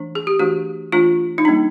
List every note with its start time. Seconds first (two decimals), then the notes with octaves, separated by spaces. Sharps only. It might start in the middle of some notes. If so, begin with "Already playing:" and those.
Already playing: E3 A3 D4
0.15 G#4
0.27 G4
0.39 E3 A3 D4 F#4
0.92 E3 A3 D4 F4
1.38 D#4
1.45 G3 A#3 D4